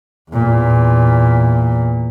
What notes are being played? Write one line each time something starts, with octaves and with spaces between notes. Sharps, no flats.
E2 A#2